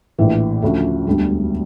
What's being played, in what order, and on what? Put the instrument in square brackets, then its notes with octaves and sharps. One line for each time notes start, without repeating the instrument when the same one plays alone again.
[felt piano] A#1 A2 E3
D2 C#3 F3 A3 C#4
E1 D2 D3 G3